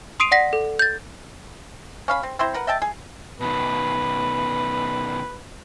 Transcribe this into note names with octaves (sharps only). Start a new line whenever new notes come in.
C6 D#6 C7 D7 D#7 F7
D5 F#5 A#6 B6
A4
G6 A6
C#4 F5 B5
C4
C4 E4 C5 A#5
A#4 B4 F#5
D#5 E5 G5 A5
G#4
B2 D#3 B4